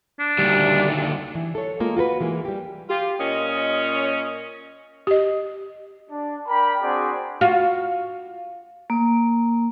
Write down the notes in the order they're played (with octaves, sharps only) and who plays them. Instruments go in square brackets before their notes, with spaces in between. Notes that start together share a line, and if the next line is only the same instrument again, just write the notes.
[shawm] D4
[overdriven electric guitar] D2 D#3 [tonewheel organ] G3
[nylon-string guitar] E3
A4 C#5
G#3 A#3 F4
F4 F#4 A#4 B4
E3 G#3 A#3
G3 G4
[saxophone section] F4 [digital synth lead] G4
[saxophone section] A#2 C#4 [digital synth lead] D#5
[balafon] G4 D#5
[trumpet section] D4
A#4 D5 G5 B5
C4 D4 F#4 G#4 D5
[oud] F4 F#4
[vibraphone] A#3